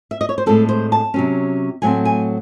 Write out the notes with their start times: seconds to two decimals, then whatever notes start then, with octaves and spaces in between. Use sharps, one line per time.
0.11 E5
0.21 D#5
0.29 C#5
0.38 C5
0.46 A2 G#3 C4 A4
0.69 C5
0.92 A5
1.14 C3 F#3 C#4
1.82 A2 F#3 A3 C4 G#5
2.05 G#5